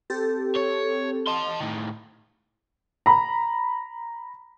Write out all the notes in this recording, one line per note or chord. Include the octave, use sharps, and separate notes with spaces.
C4 G4 A4
C#5
D#5 A5 C6
A2 D#3
A#5 B5